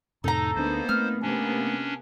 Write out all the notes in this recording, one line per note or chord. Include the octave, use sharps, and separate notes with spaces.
F2 A2 C3 D#4 A4 A#5
D2 A#3 B3 D4 D#4 C5
A3 C4 F6
C3 A#3 B3 C#4 D4